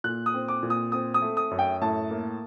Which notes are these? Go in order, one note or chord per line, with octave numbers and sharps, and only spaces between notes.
A#2 F#6
D#6
C4
D6
A#2
D#6
C4 D#6
D#6
A3
D#6
F#2
G5
A2 A5
A#3